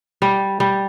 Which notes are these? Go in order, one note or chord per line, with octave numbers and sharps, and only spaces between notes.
G3
G3